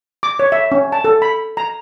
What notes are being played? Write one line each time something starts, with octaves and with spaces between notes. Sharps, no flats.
D6
C#5
E5
C#4
A5
A4
B5
A#5